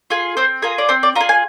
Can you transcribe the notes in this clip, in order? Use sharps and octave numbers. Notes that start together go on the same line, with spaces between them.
F4 G#4
C4 C5
F4 G#4 A#4
D5
C4 C5
D5
F4 G#4 A#5
G#5